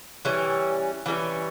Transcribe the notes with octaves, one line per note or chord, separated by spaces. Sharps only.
E3 G3 C#4
E3 G3 C#4